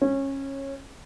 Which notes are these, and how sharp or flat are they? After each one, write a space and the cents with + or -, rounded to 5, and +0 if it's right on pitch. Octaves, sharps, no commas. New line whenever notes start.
C#4 -20